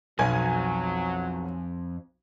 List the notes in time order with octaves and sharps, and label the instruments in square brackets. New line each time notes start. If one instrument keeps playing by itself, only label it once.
[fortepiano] B1 [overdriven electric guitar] F2 [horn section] F#3 [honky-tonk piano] G#5